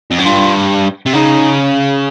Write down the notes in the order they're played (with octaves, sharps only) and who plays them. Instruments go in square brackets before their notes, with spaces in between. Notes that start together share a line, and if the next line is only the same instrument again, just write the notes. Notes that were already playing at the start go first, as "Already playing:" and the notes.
[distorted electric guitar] F2
F#2
[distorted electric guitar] G2 [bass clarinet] F4
[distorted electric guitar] C3
[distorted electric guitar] C#3 [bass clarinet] D#4